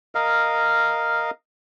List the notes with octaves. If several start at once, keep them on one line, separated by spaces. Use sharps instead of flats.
A#4 D#5 F5